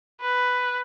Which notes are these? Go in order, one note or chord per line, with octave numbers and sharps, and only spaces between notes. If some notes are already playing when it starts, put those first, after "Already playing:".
B4